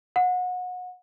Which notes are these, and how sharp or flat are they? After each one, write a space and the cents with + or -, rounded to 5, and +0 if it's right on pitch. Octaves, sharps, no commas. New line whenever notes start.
F#5 -30